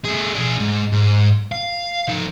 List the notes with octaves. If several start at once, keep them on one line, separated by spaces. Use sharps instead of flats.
A3 G#4
D4 G#4
G#2
G#2
F5
F3 D#4